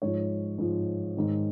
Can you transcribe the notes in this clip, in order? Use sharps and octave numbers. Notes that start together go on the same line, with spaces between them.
G#2 F3 C#5
G#2 F3
G#2 D#3